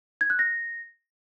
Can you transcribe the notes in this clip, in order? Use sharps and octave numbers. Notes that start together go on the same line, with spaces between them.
G#6
F#6
A#6